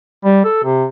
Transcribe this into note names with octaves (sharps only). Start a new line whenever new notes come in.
G3
A4
C3